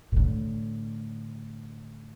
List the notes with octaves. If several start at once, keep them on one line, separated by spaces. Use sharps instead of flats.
A2 D3